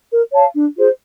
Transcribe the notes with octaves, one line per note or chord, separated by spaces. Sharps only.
A#4
C#5 F5 A5
D4
F4 G#4 C5